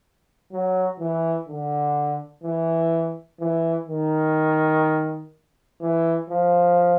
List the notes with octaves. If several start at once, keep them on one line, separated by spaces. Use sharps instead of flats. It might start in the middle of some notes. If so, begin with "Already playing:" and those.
F#3
E3
D3
E3
E3
D#3
E3
F3